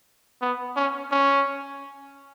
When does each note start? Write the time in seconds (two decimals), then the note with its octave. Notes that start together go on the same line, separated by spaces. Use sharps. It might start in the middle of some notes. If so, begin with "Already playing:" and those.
0.41 B3
0.76 C#4
1.11 C#4